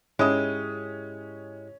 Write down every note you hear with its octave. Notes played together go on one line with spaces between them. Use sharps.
G#2 G#3 C#4 E4 G4 D#6